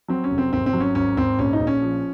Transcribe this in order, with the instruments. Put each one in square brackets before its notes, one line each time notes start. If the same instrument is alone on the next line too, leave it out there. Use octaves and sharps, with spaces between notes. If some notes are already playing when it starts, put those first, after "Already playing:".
[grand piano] F#3 C4
C#4
F1
C4
G#1 C4
C4
F#3
C#4
G#1 C#4
G#1 C4
A#1 C#4
D#4
A#1
C#4
F3